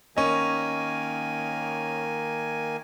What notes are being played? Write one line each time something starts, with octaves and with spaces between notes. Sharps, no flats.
D#3 A#3 C#4 D#5 G#5